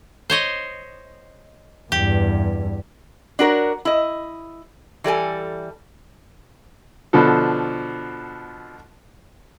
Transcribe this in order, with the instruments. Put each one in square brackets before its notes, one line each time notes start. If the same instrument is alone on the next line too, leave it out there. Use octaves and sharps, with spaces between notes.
[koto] C5 C#5 D#5
[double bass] E2 G2 [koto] G4
[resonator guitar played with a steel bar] D4 F#4 A#4 C#5
E4 D#5
E3 G3 A4 G#5
[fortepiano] B2 D3 F3 A4